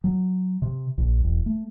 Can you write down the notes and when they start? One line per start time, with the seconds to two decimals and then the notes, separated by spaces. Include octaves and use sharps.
0.04 F#3
0.62 C3
0.98 A#1
1.23 E1
1.46 A3